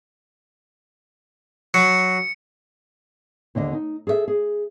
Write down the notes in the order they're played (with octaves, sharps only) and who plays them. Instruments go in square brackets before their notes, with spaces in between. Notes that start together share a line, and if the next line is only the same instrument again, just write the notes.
[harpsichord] F#3 [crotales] C#7
[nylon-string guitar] D#2 D3 D4 D#5
D#4
G#4 A4 C#5 E5
G#4